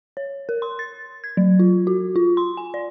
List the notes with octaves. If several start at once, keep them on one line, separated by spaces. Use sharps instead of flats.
C#5
A#4
C6
A6
G#6
F#3
F4
F#4
F4
C6
G#5
D5